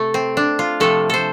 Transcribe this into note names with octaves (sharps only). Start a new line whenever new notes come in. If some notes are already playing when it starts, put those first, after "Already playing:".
Already playing: C3 A3 A4
C4
D4
F4
C3 F3 A3 A4
A4 C5